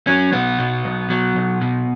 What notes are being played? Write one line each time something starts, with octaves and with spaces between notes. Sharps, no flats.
F#3 C#4
B1 B3
B2
B1
F#3
B1
B2